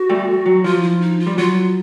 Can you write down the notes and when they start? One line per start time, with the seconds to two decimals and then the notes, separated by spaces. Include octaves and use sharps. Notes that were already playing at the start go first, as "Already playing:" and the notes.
Already playing: F#4
0.09 G3 A3
0.46 F#3
0.64 F3 F4
0.83 E4
1.01 D#4
1.19 F4
1.27 G3
1.38 F#3 F4